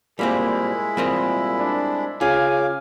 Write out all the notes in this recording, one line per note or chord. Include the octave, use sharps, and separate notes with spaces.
A#2 G3 G#3 A#3 C4 E4 G#4 B5
A#2 G3 C4 D#5
D4
C#3 F4 F5 G#5 D6